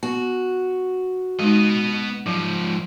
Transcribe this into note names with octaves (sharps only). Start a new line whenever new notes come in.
B3 F#4
G#3 B3 D#4 D#5
G#2 F3 F#3